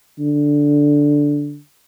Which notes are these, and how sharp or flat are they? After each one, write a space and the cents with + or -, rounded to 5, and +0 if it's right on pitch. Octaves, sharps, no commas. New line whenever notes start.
D3 -5